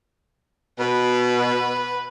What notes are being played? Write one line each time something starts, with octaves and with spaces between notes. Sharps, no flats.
B2 B4